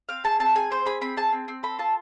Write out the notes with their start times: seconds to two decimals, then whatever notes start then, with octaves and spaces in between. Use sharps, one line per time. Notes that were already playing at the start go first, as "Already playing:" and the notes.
0.09 C4 F5
0.24 G#4 A5
0.40 C4 A5
0.55 G#4 G#5
0.70 C4 C5
0.85 G#4 B5
1.01 C4 B5
1.17 G#4 A5
1.32 C4
1.48 C4
1.63 A4 B5
1.79 F4 A5